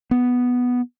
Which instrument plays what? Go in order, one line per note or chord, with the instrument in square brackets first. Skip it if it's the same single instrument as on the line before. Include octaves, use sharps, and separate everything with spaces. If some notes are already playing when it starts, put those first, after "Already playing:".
[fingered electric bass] B3